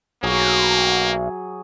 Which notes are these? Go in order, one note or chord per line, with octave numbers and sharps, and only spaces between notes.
B1 F#3 A#3 G#4